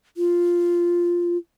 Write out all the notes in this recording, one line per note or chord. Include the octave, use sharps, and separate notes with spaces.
F4